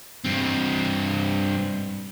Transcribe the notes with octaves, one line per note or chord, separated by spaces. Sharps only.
G2 C4